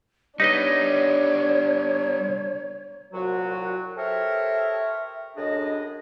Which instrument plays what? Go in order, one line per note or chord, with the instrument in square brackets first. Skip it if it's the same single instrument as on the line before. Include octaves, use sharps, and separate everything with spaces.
[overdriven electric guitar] G3 B3 [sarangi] D4 [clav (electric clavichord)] D#4 B4 D#5 [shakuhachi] C#5
[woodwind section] C2 A#2 F#3 F#4
G4 A4 A#4 C5 C#5 E5
F#2 A2 D4 G#4 D#5